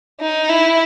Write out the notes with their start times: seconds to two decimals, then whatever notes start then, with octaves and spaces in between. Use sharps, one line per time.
0.20 D#4
0.49 E4